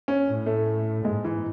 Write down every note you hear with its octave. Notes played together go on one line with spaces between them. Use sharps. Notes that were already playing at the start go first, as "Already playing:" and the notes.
C#4
A2
A3
G#2 G#3
E3